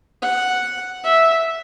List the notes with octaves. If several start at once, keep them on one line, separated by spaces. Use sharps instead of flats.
F#5
E5